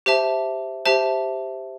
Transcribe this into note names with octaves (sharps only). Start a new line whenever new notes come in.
G4 C5 E5 A5
G4 C5 E5 A5